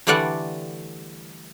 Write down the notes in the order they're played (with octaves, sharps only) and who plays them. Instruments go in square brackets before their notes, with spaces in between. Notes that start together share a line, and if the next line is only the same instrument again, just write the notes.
[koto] D3 E3 G3 A3 D5 F#5